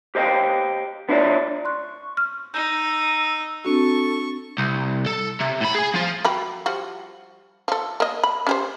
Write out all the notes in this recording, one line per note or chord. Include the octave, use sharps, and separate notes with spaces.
G4 C5 D#5 F5 G5
B3 D4 E4 F4 C#5 D5
C6 C#6 F#6
F6
D#4 E6 G6
C4 D4 F#4 A4 C#6
C2
A4
C3
A2 B5
G#4 G#5
F3 F4
F#3 G4 B5
F3 G3 F#4
F3 A4
A#3 D#5
B5
C#4 G4 C5